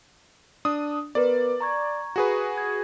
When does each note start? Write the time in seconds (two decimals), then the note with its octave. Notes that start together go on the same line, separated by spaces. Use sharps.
0.65 D4 D#6
1.15 B3 A#4 B4 D5
1.61 A#5 C#6 G#6
2.16 F#4 G#4 B4
2.58 G#6